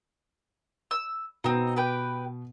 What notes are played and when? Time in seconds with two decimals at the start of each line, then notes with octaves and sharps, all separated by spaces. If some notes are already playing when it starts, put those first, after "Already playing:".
0.91 E6
1.44 B2 B3 C4 D#4
1.76 G4 B4 G5